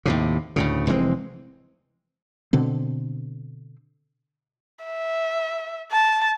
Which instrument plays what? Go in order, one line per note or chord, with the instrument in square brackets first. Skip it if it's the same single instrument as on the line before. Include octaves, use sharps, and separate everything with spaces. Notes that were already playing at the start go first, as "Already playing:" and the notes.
[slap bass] D#2 A2 C3
D2 A2 C#3
F1 E3 G#3 C4
[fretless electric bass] B2 D3 C4
[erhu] E5
A5